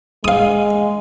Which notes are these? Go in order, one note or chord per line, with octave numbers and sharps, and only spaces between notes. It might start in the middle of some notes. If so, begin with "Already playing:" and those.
G#3 F5 D#6